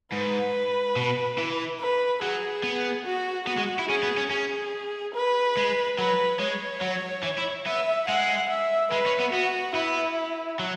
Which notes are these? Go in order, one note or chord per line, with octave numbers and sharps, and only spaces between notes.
G#2 B4
B2
E3
B4
F#3 G#4
B3
F#4
B3 F#4
G#3
E4
C#4 G#4
B3
C#4
C#4 G#4
B4
G#3
F#3 B4
G#3 C#5
F#3
E3
E4
B3 E5
G#3 F#5
E5
G#3 B4
C#4
B3
B3 F#4
B3 E4
F#3